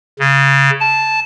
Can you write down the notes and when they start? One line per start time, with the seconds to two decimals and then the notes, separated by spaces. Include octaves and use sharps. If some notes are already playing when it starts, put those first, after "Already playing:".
0.19 C#3
0.80 A5